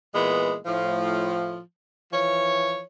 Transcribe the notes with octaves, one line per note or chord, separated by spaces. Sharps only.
A#2 E3 G#3 B3
A2 F3
E3 F3 C#5